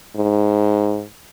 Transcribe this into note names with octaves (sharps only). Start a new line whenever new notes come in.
G#2